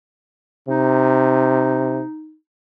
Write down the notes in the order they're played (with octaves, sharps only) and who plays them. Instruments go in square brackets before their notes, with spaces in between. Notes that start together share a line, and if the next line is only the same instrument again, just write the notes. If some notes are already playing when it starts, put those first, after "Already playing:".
[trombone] C3 [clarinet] D#4